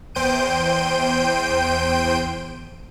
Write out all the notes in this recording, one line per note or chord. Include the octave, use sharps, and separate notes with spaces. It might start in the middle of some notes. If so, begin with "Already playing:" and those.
E2 C5 G5 G6 D7 D#7